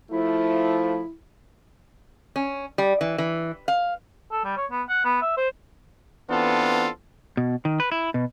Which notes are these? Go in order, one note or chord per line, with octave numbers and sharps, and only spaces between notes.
F3 A3 E4
C#4
G3
E3
E3
F5
A4
G3
C#5
B3
F#5
B3
E5
C5
E3 B3 C4 D4 F4 A4
B2
D#3
B4
E4
B2